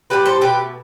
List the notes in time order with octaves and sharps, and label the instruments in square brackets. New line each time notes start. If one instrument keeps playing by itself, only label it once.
[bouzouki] A2 G3 G4 B4
A4 C5
B2 A3 G4 B4